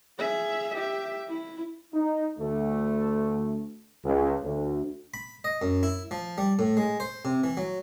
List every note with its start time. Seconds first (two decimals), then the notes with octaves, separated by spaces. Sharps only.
0.19 G#4 E5
0.76 G4 E5
1.28 E4
1.92 D#4
2.38 D2 A3
4.04 C#2
4.43 D2
5.14 B5
5.44 D#5
5.62 F#2
5.83 E4
6.11 F3
6.38 G3
6.59 A2
6.77 G#3
7.00 C5
7.25 C3
7.44 E3
7.57 F#3